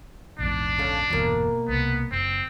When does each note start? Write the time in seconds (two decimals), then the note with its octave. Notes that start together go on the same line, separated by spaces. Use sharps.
0.39 A#1 E2 G#2 D4
0.78 C#3 A4 F5
1.10 G1 E2 B2 A#3
1.69 C2 B3
2.12 F#1 C4